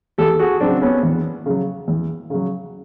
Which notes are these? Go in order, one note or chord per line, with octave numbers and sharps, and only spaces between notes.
E2 G4 A4
F#4 G#4
C#3 F#3 C4 D4
B3 C#4
E2
C#3 F#3
E2
C#3 F#3